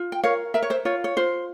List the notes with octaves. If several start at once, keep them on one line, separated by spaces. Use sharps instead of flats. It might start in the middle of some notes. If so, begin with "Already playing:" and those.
Already playing: F4
G5
A#4 C#5 F5
A#4 E5
C#5
C5 E5
F4 C#5
C#5
F4 C5